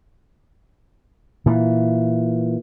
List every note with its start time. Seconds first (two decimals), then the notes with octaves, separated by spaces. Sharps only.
1.46 A#2 E3